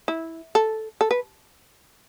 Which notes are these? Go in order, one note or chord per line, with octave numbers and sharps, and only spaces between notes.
E4
A4
A4
B4